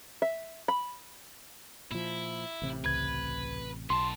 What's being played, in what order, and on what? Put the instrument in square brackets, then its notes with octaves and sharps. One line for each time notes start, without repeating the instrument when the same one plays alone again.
[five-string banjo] E5
B5
[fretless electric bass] A#2 F3 [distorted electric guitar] E4
[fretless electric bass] A1 C3
[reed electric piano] C#2 G#6 [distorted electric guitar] B4
[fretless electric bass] B1 [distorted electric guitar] B3 A5 [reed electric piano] C6